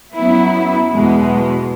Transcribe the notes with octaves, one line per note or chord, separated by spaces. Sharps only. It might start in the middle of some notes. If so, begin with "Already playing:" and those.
F#2 F#3 B3 E4
E2 B2 G#3